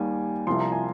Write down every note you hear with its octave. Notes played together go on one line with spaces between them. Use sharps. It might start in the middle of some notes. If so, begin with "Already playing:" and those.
Already playing: D#2 D#3 G3 G#5
C2 C3 F3 C6
A#5
G#5